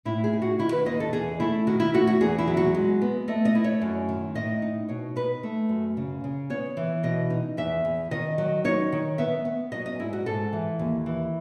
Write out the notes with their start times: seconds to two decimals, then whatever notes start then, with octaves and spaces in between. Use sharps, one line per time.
0.05 A2 E4
0.24 G#4
0.33 D#4
0.42 F#4
0.59 D#3 E4
0.72 B4
0.86 D#2 D#5
1.00 A4
1.13 E2 G#4
1.40 A3 E4
1.67 D#3 F#4
1.80 E4
1.94 A3 F#4
2.07 F#4
2.21 E2 G#4
2.38 E4
2.47 F#3
2.57 F#4
2.75 G#3
3.02 B3
3.28 A3 D#5
3.45 D#5
3.55 E4
3.64 C#5
3.82 F#2
4.09 D#3
4.35 A2 D#5
4.62 D#4
4.89 B2 C#5
5.16 D#4 B4
5.43 A3
5.69 F#2
5.97 C#3
6.24 C#3
6.50 B3 C#5
6.77 E3
7.03 B2 D#5
7.30 D#4
7.57 E2 E5
7.85 E2
8.11 D#3 D#5
8.38 F#3
8.64 D#4 C#5
8.92 D#3
9.18 B3 E5
9.45 B3
9.72 F#3 D#5
9.86 D#5
10.00 G#2 E4
10.13 F#4
10.26 G#2 A4
10.53 E3
10.79 D#2
11.06 E3